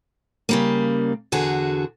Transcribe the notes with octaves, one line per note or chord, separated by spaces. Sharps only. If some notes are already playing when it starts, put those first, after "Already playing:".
C#3 G3 A#3
E2 D3 F#4 G#4